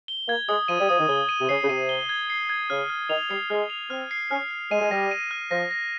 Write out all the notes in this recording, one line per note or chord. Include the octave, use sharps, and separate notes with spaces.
G7
A#3 G#6
G#3 D#6
F3 D#7
G3
F3 D#6
D#3
C#3 G7
D#7
C3
C#3 C7
C#3
C3 D#7
G7
G#6
C7
G#6
C#3 F6
F6
D#3 F7
G3 C7
G#3 F6
F7
C4 F6
C7
C#4 F6
F6
G#3 D#7
G#3
G3 A#6
D#7
F6
F3 A#6
A#6